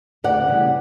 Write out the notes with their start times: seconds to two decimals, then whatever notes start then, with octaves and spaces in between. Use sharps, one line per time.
0.24 D2 D5 F#5
0.48 C#3 E3 G3